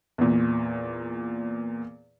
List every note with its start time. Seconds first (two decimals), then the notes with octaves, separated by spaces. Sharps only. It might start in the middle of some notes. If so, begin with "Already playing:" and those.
0.18 E2 A#2